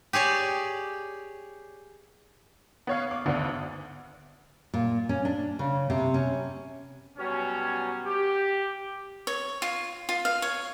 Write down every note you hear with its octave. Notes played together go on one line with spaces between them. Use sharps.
G4 G#4 C#5 D5
B3 C#5 F5
D6
G#1 D2 B3 D4
A#2
C#4
D4
C#3
C3
C#4
B2 F#3 G3 C#4
G4
C#5
F4
F4
F5
C#5